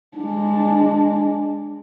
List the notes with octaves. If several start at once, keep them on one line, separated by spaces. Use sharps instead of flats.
G#3 D4